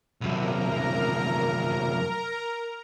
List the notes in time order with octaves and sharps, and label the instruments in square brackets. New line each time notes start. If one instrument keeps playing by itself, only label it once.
[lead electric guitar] C2 F#2 [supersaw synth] A#4 A#5